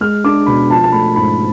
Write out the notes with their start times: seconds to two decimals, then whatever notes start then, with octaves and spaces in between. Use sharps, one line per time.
0.01 G#3 F6
0.24 D4 D6
0.46 B2 B5
0.70 F3 A5
0.84 A5
0.92 A3 B5
1.16 G#2 B5